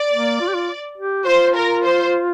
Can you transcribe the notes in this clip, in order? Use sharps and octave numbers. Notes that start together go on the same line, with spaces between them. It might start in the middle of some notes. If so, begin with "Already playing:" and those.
Already playing: D5
A#3
F4
G4
F4
G4
F4 C5
A#4
C5